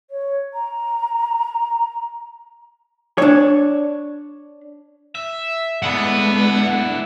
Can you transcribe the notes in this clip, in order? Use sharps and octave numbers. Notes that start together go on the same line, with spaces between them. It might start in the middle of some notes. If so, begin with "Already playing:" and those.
C#5
A#5
D4 C#5
E5
G#3 A3 B3 D4 E4 F#5 B5